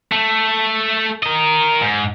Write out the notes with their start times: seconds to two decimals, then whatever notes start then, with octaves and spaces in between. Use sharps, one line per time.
0.12 A3
1.23 A#4 D#5
1.81 G#2